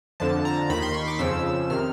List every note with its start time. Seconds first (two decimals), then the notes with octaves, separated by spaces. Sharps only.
0.20 F2 D3 F3 A5
0.45 A#5
0.70 D#2 D#3 B5
0.82 C6
0.94 C#6
1.07 D6
1.19 F2 C#3 F3 E6
1.70 C3 D#3 F6